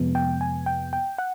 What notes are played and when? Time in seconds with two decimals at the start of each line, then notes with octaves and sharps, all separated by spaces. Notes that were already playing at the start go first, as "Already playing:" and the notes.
Already playing: F2 C3 F3 G#3 B3
0.15 G5
0.41 G#5
0.66 G5
0.93 G5
1.18 F#5